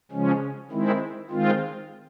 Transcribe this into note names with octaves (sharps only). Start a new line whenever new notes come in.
C#3 F3 G#3 C#4
D#3 G#3 C4 E4
D#3 G#3 C4 F4